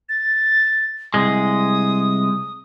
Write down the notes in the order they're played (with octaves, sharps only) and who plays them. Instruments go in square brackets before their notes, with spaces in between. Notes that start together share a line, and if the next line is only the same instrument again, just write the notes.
[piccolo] A6
[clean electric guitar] C2 G#3 [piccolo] D#6